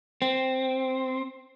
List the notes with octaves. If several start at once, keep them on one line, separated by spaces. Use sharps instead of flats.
C4